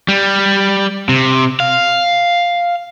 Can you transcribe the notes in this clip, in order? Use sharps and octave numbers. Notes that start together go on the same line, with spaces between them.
G3
C3
F5